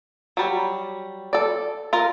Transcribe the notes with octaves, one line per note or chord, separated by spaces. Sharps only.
F#3 G3
A4 D5
F4 A#4